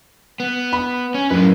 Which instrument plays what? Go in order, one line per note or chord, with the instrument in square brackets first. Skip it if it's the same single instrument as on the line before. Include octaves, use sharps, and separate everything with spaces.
[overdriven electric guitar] B3
[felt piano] B5
[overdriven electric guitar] C#4
[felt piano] F#2 [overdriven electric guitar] A2 B4